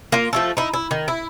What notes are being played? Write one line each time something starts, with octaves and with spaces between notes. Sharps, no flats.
A#3 F4
F3 A3 A4
D#4 E4
E4
D#3
E4